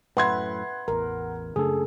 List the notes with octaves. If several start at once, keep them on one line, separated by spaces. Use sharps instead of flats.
F#2 A2 B4 E5 F#5 C6 G#6
A1 E2 A#4
F#2 C#3 A3 D4 G#4 A4